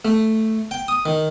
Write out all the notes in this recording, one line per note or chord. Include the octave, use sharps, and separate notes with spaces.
A3
G5
D#6
D#3